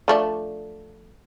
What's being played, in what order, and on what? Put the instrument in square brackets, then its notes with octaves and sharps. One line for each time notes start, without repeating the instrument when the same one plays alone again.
[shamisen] F3 A3 D4